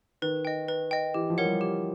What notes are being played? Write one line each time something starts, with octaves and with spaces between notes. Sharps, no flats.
D#3 B4
D#5 G5
B4
D#5 G5
E3 G4
F3
A#4 C#5 F#5
G3
G4